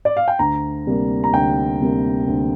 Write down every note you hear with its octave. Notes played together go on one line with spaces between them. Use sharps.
D5
F5
G5
D2 A#5
C3 G3 A#3
A#5
D2 G5
C3 G3 A#3
D2